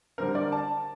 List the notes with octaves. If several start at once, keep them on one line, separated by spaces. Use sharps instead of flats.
D3 G3 C4 A#4
D5
A5